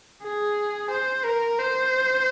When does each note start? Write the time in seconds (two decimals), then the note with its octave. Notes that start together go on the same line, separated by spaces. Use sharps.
0.23 G#4
0.90 C5
1.24 A#4
1.58 C5